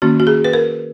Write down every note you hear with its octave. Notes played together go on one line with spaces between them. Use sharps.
D#3 A#3 C#4 F#4
F#4
G#4
B4
A#4